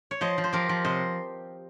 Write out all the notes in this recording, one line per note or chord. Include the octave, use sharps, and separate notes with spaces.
C#5
F3 C5 D#5
F3
C5
F3 G4 A#4
F3
C3 C5 D#5